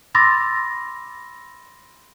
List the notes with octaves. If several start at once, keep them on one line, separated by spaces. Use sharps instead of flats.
B5 C6 D6 E6 A6 A#6